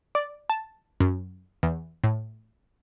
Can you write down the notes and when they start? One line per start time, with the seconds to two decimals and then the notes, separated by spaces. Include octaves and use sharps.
0.15 D5
0.50 A5
1.00 F#2
1.63 E2
2.04 A2